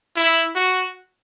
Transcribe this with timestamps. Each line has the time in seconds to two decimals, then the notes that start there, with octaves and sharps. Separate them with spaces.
0.16 E4
0.55 F#4